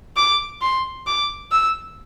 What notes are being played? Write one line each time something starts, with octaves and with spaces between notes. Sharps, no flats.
D6
C6
D6
E6